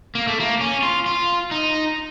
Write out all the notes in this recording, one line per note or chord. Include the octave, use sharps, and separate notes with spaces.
A#3
A3
A#3
C#4
F4
F4
D#4